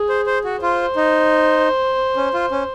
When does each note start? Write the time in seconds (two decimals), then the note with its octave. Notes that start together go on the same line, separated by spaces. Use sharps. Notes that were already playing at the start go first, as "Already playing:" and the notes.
Already playing: G#4
0.09 C5
0.27 C5
0.44 F#4
0.62 F4 C5
0.96 D#4
2.17 C#4
2.34 F4
2.51 C#4